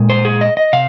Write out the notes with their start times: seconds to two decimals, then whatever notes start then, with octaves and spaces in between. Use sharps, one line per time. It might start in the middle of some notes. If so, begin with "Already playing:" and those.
Already playing: A#2 G#3
0.10 C5
0.25 G#4
0.41 D#5
0.57 D#5
0.73 C3 F5